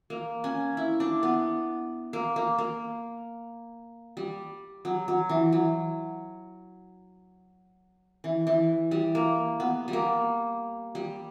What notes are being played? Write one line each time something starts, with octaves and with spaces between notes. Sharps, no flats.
A#3
C#4
E4
D4
B3
A#3
A#3
A#3
G3
F#3
F#3
E3
F#3
E3
E3
G3
A#3
B3
G3
A#3
G3